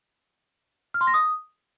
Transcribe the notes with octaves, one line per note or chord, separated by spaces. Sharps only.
F6
C6
A#6
D#6